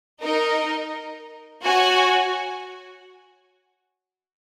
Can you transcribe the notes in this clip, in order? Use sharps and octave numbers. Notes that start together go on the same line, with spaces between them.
D#4 A#4 D#5
F#4 C#5 G#5